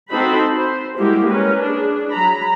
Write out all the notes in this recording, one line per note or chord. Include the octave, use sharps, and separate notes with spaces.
C4 D#4 F#4 A4 C5 B5
C5
G3 G#3 A#3 E4 F#4 G4
C#4 A#4 B4
D4 G#4
F#3 A#5 B5